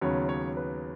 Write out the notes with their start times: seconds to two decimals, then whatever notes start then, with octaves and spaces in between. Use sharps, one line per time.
0.01 D#2 C#3 F#3 B3 C#5
0.29 C#5
0.57 B4